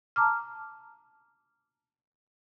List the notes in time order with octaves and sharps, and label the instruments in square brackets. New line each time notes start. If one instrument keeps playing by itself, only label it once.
[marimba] A5 A#5 D6 F6